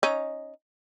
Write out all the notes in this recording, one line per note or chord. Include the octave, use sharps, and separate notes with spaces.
C#4 D#4